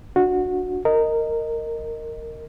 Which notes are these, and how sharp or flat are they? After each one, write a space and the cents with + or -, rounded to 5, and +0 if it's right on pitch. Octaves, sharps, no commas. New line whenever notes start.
D4 +0 F#4 -20
A#4 -15 D#5 +0